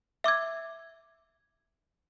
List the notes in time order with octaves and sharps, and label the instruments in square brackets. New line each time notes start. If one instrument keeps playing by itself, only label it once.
[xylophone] E5 D6 E6 G#6